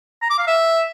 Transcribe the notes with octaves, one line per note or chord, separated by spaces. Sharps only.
A#5
D6
F5
E5